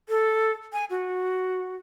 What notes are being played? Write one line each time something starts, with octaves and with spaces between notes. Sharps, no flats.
A4
G#5
F#4